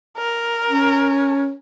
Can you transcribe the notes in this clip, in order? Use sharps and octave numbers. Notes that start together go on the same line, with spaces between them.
A#4
C#4